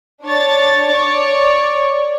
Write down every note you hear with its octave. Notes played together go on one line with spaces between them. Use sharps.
D4 C#5 A6
C#5 D5